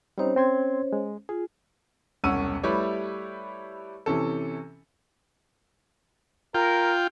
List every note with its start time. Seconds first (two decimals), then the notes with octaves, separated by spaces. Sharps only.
0.18 G3 C4 C#4 D#4 C5 C#5
0.36 C4 C6 G#6
0.93 G#3
1.29 F4 G#4
2.24 E1 C2 C#4 F#5 E6 D#7
2.63 G3 A3 E4 G4 B4 C#5
4.06 C3 E3 C#4 A4
6.54 F4 A#4 G5